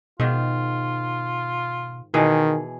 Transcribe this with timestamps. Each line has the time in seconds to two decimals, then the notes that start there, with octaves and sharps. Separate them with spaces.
0.20 G#2 B2 D#3 F4
2.14 B2 D#3 E3 G#4